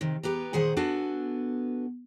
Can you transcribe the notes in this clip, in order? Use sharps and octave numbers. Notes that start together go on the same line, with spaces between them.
C3 D#3
B3 G4 B4 A#5
A#2 D#3 G#4 C5 F#5
B3 D4 F#4 A4 G#5